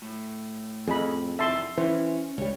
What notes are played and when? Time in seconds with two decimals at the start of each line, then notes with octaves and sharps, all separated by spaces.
0.02 A2
0.88 F2 G#4 D#5 B5
1.39 C3 D#3 E4 E5 A5 C6
1.78 E3 C#4 C5
2.38 C#2 G3 C#5